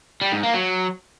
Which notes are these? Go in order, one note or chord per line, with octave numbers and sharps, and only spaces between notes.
G3
G#2
A#3
F#3